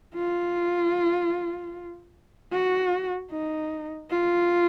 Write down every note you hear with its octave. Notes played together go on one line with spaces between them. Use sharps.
F4
F#4
D#4
F4